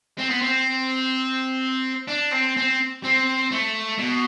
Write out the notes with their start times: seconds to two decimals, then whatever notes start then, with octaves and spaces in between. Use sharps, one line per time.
0.19 C4
0.30 B3
0.42 C4
2.08 D4
2.32 C4
2.57 C4
3.04 C4
3.52 A3
3.98 B2